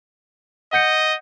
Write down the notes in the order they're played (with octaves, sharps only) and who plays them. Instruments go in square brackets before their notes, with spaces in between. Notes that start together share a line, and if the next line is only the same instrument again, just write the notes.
[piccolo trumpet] D#5 [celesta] F#5 G6 C#7